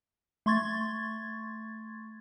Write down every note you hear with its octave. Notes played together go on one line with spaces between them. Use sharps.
A3 C6 C#6 G#6 A6